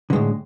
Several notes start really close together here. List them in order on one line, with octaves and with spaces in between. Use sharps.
D3 G#3 A2